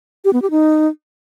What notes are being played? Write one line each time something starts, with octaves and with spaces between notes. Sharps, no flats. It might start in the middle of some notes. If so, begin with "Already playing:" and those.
G4
B3
G4
D#4